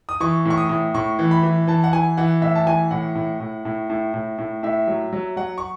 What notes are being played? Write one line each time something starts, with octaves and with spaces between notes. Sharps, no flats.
D#6
E3 C#6
A2 C#6
D#6
A2
A2 C#6
E3
B5
E3
E3 A5
F#5
E3 G#5
E3 F#5
A2 E5
A5
E3 G#5
A2 F#5
A2
A2
A2
A2
A2
A2
A2 E5
F#3
F#3
F#3 F#5
C#6